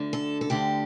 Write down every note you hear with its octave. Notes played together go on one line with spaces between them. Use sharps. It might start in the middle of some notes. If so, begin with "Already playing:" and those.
Already playing: D2 D3
A4
A4
D2 D3 G4